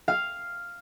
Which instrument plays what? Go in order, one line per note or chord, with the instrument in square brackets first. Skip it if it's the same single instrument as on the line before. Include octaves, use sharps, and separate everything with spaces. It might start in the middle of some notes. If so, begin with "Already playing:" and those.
[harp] F5